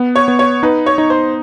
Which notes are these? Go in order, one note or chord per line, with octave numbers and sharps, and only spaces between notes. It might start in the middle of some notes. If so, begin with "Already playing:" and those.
Already playing: B3
C#5
B3
C#5
D#4 B4
C#5
D#4
C5